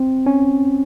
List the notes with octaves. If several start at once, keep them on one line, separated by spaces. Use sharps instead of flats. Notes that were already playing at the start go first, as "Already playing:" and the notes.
Already playing: C4
C#4